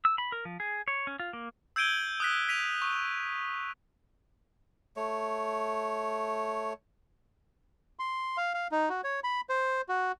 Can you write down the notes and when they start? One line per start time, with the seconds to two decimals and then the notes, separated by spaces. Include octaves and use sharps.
0.05 E6
0.18 B5
0.32 A#4
0.45 F3
0.60 G#4
0.88 C#5
1.07 C#4
1.20 F4
1.33 A#3
1.76 E6 G6 G#6 D7 D#7 G7
2.20 D#6 F#6 B6
2.49 B6 D#7 F7
2.82 C#6
4.97 A3 C#5
7.99 C6
8.37 F5
8.54 F5
8.72 D#4
8.89 F#4
9.04 C#5
9.24 B5
9.49 C5
9.89 F#4